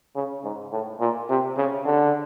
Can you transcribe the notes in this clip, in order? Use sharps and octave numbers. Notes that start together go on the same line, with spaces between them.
C#3
G#2
A2
A#2
C3
C#3
D3